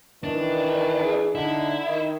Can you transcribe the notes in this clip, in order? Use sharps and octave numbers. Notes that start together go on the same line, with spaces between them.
D#3 E3 D4
G#4
D3 D#4 E4
D#3 D#4